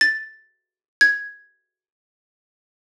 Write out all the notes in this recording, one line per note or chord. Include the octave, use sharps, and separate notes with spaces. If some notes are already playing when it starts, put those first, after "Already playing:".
A6
G#6